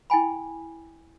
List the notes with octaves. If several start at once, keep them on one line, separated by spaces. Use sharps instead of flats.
E4 G5 G#5 B5